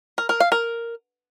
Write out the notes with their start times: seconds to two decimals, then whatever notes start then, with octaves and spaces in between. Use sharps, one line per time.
0.18 A#4
0.29 A#4
0.40 F5
0.52 A#4